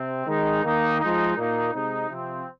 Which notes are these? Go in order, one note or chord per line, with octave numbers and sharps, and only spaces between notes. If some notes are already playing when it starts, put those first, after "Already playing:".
Already playing: C3 C4
D#3 G#3 D#4
D#3 A#3 D#4
F3 G#3 D#4
A#2 A#3 D#4
C3 G#3 C4 D#4
C3 F3 C4